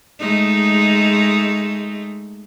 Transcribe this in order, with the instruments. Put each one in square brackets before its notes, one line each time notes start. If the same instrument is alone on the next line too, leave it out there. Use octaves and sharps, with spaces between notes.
[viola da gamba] G#3 A3 D#4